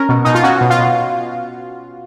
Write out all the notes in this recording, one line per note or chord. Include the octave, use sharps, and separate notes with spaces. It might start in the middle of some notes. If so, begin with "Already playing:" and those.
Already playing: C#4 A#4
B2
B2 D#4
F4
C#4 F#4
B2
F4
B2